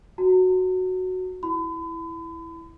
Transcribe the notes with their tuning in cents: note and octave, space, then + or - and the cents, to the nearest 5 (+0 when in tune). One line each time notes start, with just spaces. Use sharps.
F#4 +0 A#5 -45
E4 +0 B5 +40